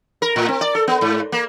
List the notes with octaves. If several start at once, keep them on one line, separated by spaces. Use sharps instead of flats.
A#4
A2
C4
D5
A4
B3
G#2
A#3